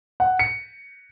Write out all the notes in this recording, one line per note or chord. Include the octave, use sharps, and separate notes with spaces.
F#5
C#7